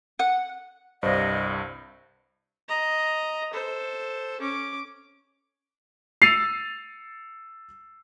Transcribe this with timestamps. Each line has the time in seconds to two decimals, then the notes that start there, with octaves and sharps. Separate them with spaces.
0.19 F#5
1.03 C2 G2 C5 D5 D#5 F5
2.68 D#5 A#5
3.53 A4 C5
4.41 C#4 D6
6.22 E6 A6 C7 C#7 D#7 F7